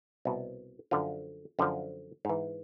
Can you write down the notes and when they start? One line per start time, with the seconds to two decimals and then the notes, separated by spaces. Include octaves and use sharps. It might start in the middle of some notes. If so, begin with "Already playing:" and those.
0.25 C2 B2
0.91 F#2 D3 F3 F4
1.59 F#2 D3 F3
2.25 G#2 E3